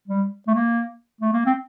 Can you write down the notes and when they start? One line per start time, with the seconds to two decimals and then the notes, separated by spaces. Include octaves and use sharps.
0.08 G3
0.47 A3
0.55 A#3
1.21 A3
1.33 A#3
1.46 C4